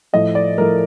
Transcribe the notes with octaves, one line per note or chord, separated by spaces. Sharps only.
A2 F3 A3 D#5
D5
A2 F3 A3 A#4